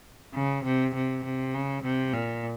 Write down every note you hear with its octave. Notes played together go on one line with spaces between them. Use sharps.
C#3
C3
C3
C3
C#3
C3
A#2